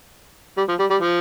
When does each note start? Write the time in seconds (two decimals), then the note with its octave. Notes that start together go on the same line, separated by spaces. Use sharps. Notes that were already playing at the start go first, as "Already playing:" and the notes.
0.57 G3
0.69 F3
0.79 G3
0.90 G3
1.01 F3